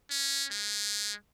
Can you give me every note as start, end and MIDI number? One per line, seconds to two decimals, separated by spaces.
0.10 0.46 61
0.51 1.13 56